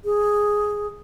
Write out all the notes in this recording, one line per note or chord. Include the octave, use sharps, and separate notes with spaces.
G#4